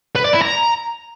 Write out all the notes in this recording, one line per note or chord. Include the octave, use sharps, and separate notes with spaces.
B4
D5
E4
A#5